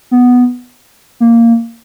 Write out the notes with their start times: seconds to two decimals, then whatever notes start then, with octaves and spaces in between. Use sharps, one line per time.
0.11 B3
1.20 A#3